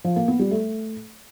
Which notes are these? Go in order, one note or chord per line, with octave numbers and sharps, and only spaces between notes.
F3
A#3
B3
G3
A3